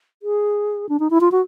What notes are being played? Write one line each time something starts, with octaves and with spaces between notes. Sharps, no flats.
G#4
D4
D#4
E4
F4
F#4